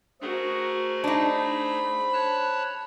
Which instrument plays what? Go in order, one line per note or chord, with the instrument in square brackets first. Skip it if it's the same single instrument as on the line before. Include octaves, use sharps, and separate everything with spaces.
[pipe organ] A3 G#4 [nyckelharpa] F#4 A#4 [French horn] C5
[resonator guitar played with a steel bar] D4 D#4 [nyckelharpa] B5
[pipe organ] C#5 A5 F#6